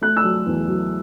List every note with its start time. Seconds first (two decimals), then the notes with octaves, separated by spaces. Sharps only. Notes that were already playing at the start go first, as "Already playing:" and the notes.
0.01 A3 F#6
0.17 E6
0.23 F#3
0.46 E2
0.67 F#3